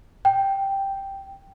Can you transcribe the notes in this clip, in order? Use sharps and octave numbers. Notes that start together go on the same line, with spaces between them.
G5